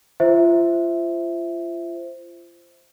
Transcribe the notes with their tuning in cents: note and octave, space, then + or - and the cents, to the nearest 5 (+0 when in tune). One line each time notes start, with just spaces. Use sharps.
F4 -30 C5 +0 E5 +0